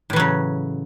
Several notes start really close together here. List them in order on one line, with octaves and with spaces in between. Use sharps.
A2 E3 F#3 C#3